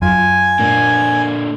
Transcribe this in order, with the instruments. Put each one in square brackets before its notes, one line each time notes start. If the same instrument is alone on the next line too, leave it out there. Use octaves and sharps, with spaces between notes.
[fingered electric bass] F#2 [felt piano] F4 [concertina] G#5
[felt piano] A#2 [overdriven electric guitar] D3 A#3